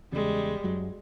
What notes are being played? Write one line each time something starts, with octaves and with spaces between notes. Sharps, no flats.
E2 C#3 G3 G#3
F#2 F#3